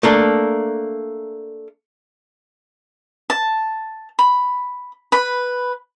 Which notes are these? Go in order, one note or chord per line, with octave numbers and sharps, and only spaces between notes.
A3 A#3 D4
A5
B5
B4 B5